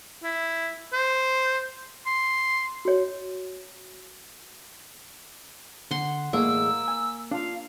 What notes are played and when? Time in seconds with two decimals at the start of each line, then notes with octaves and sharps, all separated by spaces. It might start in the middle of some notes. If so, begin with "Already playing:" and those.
0.23 E4
0.93 C5
2.06 C6
2.85 F#4 C#5
5.91 D3 F#5 C6
6.33 E2 A2 G#3 A#3 E6
6.88 G#5
7.31 D4 F4 F5